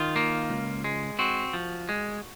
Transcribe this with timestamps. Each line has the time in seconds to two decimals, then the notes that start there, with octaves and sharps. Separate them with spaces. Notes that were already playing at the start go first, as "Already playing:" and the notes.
Already playing: D#3 F4
0.16 A#3
0.50 C#2
0.84 G#3
1.19 C4 F#4
1.53 F3
1.89 G#3